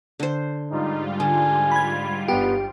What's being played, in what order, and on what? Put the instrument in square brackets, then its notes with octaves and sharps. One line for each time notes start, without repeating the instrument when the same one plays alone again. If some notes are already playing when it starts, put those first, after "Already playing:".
[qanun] D3 C5
[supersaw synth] G#2 G3 F4 [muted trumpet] D#4
[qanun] D3 [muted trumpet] G#5
[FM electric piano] B5 G#6
[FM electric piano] G1 G4 [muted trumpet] B3